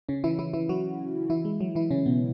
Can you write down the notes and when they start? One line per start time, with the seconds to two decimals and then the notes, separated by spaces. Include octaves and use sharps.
0.09 C#3 C#4
0.24 E3 E4
0.39 E3 E4
0.53 E3 E4
0.69 F#3 F#4
1.30 E3 E4
1.45 G#3
1.61 F#3
1.75 E3 E4
1.91 C#3 C#4
2.06 B2 B3